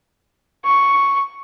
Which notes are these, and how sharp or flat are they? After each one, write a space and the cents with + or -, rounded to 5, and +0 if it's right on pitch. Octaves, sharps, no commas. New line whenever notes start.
C#6 +0